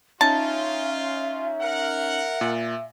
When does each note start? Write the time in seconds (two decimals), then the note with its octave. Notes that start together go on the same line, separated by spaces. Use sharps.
0.21 C#4 D#4 F4 E5 A5 C6
1.61 A#4 F#5
2.41 A#2